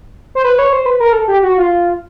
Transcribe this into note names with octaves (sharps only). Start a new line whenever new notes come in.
C5
B4
C#5
C5
B4
A#4
A4
G4
F#4
F4